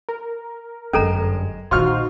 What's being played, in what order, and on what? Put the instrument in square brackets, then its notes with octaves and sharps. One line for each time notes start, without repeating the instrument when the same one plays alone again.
[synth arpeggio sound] A#4
[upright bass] G1 F#2 [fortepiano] G#3 [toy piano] C#4 A4 A#5
[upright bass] A#2 D#3 [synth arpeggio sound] D#4 F#4 C5 [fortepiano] F4 C#6 F6